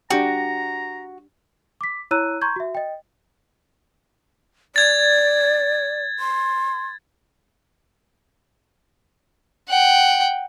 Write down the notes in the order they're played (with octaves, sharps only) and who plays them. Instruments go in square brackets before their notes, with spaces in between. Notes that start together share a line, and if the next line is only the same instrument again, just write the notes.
[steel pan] D4 G4 G5 [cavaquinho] F#4 [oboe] A#5
[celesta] D6 B6
E4 C#5 A#5 E6 F#6 D#7
A#5 C6 C#6 G6 G#6
F#4 E5
D#5 G5
[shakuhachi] D5 [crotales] G#6 A6
[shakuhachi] C6
[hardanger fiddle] F#5 G5